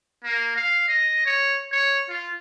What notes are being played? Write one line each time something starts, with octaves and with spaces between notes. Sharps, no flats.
A#3
F5
D#5
C#5
C#5
F4